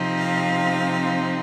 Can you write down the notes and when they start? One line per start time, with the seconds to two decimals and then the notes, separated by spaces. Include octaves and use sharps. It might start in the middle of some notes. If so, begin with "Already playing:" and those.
Already playing: C3 F3 C4 D#4
0.19 F5